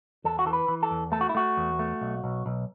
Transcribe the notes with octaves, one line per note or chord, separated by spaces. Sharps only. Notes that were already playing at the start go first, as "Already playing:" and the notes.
E2 A4
F#4
E3 A4
B4
E3
A4
E2
A3 A4
F#4
E4
A3 F#4
E2
A3
B1
B1
B1